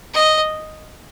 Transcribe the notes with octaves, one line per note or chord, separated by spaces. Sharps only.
D#5